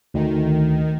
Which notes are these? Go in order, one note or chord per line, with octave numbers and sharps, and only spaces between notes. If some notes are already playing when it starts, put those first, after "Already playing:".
D2 D#3